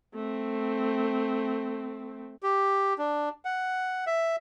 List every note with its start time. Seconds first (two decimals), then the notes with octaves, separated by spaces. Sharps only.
0.14 A3 C4
2.43 G4
2.98 D4
3.45 F#5
4.07 E5